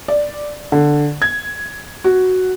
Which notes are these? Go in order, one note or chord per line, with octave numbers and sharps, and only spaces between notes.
D5
D3
G#6
F#4